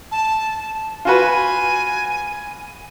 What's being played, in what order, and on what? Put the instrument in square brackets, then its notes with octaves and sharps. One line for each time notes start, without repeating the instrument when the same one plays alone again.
[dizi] A5
[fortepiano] F4 F#4 B4 [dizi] G#5